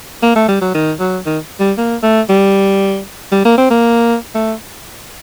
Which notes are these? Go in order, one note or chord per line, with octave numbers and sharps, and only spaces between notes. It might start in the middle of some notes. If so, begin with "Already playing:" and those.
A#3
A3
G3
F#3
D#3
F#3
D#3
G3
A#3
A3
G3
G3
A#3
C4
A#3
A3